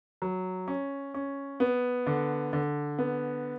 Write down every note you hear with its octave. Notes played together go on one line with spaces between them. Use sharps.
F#3
C#4
C#4
B3
D3
D3
B3